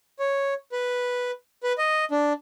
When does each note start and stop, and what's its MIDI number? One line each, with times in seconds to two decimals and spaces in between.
0.19 0.54 73
0.72 1.31 71
1.63 1.73 71
1.78 2.05 75
2.11 2.33 62